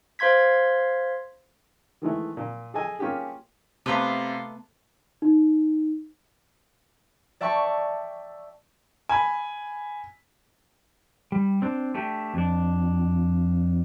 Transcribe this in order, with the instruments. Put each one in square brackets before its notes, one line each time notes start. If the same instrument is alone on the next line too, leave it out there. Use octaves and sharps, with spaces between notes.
[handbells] C5 F5 C6 G#6 B6
[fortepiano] D#3 E3 G#3 A3
A#2
G#4 A4 D#5 G#5
A#3 C#4 F4 G4 G#4
[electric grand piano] C3 [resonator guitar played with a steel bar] A3 B3 A#5 [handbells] F5 C6 D6
[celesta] D#4
[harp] D5 E5 G5 A5 C#6
[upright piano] G#5 B5
[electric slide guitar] G3
C4 D4
A3 D4 G4
F2 D4